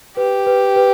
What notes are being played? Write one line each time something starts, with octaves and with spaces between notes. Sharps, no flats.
G4 B4
B4
B4